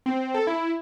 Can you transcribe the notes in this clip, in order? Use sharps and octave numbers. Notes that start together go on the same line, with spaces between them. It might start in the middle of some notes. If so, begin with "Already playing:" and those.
C4
A4
E4